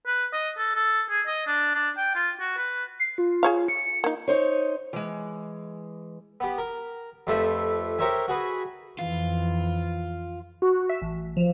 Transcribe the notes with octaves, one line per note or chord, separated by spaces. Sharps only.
B4
D#5
A4
A4
G#4
D#5
D4
D4
G5
F4
F#4
B4
C7
F4
G#4 C#5 F5
C#7
A#3 D#4
D#4 C5 C#5
E3 G#3
B3 G4
A#4
F2 A3 G4 B4 C5 E5
G4 A#4 C5 C#5 E5 G#5
F#4 G#4 B4
F2 E3 F4
F#4
E5
A1
F3